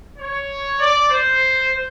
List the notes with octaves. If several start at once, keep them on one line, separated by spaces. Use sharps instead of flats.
C#5
D5
C5